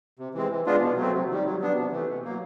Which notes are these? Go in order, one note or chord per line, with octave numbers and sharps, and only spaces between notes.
C3
E3 G#3 C4
E3
G#3 B3 D4 F4
B2
F#3 A3 C4
C3
D#3 G3
F#3
B3 D4
C3
E3 A3
B2
F#3 A#3